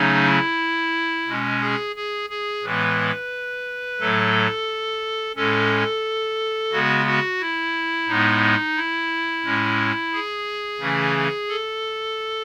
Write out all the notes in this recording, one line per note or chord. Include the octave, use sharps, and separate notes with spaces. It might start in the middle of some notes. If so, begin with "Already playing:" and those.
Already playing: C#3 F#3 A3 C#4 D#4
E4
B2 G#3 C#4
G#4
G#4
G#4
A2 E3 G#3 B3 B4
A2 F#3 A3 A4
A2 G#3 C#4 A4
C#3 G#3 B3 F#4
F#4
E4
A2 G#3 B3 D#4
E4
A2 G#3 C#4
G#4
C#3 E3 A3 C#4
A4